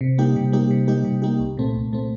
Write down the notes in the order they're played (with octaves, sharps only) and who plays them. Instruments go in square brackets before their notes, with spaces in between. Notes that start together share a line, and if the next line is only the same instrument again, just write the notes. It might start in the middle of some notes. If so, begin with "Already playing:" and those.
[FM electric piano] C3
G3 A#3 D#4 G4
C3
G3 A#3 D#4 G4
C3
G3 A#3 D#4 G4
C3
G3 A#3 D#4 G4
C2
A#2 A3 C4
C2
A#2 A3 C4